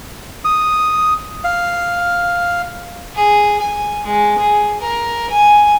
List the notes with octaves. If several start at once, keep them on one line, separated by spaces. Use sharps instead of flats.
D#6
F5
G#4
G#5
G#3
G#4
A#4
G#5